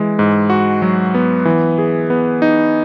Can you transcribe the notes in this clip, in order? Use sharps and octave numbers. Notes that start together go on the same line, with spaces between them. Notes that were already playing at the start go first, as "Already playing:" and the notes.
Already playing: E3 G#3
G#2
F#4
F#3
B3
E3
G#4
B3
D#4